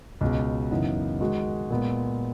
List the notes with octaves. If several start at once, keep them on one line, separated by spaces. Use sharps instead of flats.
C#2 B2 G#3
F#2 C#3 E3 B3 D#4
D#3 G#3 D#4 F#4
A#2 G#3 B3